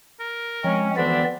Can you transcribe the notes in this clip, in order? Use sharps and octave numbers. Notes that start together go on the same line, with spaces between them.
A#4
F3 G#3 C4 C#4
D2 E3 B3 C4 D4 D5 B5